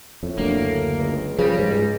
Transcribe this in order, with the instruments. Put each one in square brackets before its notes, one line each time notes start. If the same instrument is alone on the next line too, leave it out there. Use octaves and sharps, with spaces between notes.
[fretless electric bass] F2 [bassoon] A2
[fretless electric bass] F#1 D2 D3 [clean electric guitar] A#3
[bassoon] C#2
[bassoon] C#3 [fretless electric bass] F3 [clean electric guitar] G3 [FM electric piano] G#4 A#6
[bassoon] C#2 [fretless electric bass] G#2 G#3